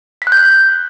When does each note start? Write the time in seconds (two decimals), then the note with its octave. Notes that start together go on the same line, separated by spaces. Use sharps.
0.22 B6
0.27 F#6
0.32 G6
0.37 F#6